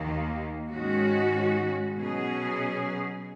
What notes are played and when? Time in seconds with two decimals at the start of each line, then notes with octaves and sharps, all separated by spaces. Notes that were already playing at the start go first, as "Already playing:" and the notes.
Already playing: D#2 D#3 A#3
0.68 G#2 D#3 G#3 C#4 F#4
1.95 B2 F#3 C#4 G#4